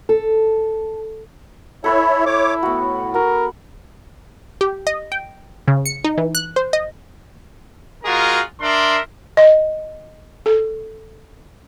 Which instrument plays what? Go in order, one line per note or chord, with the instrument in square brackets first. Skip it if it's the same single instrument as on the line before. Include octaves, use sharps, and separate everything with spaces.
[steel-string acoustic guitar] A4
[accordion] E4 C#5 E5 [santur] A4 B4 G#5
[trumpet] E4 [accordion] C#5 D6
[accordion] A2 [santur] B3 F#4
[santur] F#4 [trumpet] A#4
[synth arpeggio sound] G4
D#5
G5
C#3
C#7
D#4
E3
F#6
C5
D#5
[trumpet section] G#3 F4 F#4 G#4 A#4
D4 A#4 E5 C6
[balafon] D#5
A4